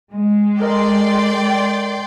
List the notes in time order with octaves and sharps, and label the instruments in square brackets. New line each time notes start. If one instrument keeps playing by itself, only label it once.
[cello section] G#3
[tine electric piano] A4 A#4 D#5 [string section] D5 G5 C6